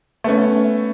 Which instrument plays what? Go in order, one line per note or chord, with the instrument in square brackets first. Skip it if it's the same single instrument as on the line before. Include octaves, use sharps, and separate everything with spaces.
[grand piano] A3 B3 C#4